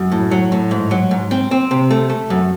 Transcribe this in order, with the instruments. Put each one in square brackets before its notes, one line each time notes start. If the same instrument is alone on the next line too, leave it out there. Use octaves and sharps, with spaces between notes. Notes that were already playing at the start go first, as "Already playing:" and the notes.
Already playing: [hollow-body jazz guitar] F#2
A2
F#3
A2
G#2
F#3
G#2
C4
C4
C3
A3
A3
F#2